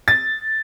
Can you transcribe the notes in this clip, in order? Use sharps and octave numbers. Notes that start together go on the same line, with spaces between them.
A6